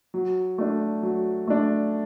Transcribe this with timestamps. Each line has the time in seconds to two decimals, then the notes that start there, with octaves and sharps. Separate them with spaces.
0.14 F#3
0.58 A3 D4
1.03 F#3
1.47 A3 D4